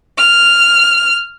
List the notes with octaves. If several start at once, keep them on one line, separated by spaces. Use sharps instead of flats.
F6